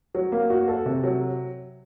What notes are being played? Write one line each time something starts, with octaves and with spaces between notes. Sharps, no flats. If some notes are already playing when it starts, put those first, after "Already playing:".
F#3
A#3
F#4
A4
C3
F#3